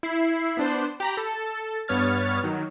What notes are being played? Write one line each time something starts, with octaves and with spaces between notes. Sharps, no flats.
E4 C7
B3 D4 C5
G4 A#5 B5
A4
G2 B3 C#5 F6 A6
D#3 F#3